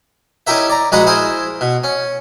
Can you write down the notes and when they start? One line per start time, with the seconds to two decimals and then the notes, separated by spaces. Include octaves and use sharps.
0.47 C#4 D#4 E4 G4 A#4 E5
0.69 D5 A#5
0.92 A#1 G#3 F#4 D#5 A#5 B5
1.07 E4 G#4 A#4 C5
1.61 B2
1.84 C#4